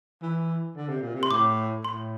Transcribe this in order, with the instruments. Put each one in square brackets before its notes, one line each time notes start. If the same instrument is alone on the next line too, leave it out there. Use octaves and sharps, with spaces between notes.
[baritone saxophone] E3
D3
C3
A#2
C3
[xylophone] C6
[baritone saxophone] A2 [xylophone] D6
[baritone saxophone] A2 [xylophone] C6